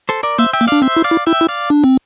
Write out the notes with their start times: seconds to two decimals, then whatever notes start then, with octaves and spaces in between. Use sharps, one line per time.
0.09 A4 C5
0.23 A#4 D5
0.38 A#3 C5 E5
0.53 E5 G5
0.61 A#3
0.67 D4 D5 F5
0.82 C4 C5 E5
0.97 E4
1.04 D5 F5
1.11 E4
1.26 E4 E5 G5
1.41 E4
1.49 D5 F5
1.70 D4
1.84 C4